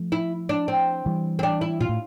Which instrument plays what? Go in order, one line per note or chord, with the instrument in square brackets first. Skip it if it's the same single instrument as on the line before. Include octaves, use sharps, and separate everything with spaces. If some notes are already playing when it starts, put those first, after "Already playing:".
Already playing: [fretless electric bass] F3 A3
[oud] E4
D4
C4
[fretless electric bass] E3 G3
[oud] C4
D4
E4
[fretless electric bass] A#2 [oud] F4
[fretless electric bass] A2